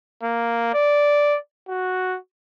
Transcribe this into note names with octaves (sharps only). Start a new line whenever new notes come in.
A#3
D5
F#4